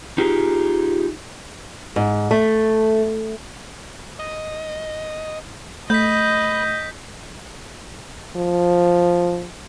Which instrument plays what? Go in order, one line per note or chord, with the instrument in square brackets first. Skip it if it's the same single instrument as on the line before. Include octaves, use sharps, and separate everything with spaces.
[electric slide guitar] D#4 F4 G4 G#4
[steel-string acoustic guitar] G#2
A3
[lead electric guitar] D#5
[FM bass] A3 [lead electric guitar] B4 [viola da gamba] D#5 [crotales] G6 B6
[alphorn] F3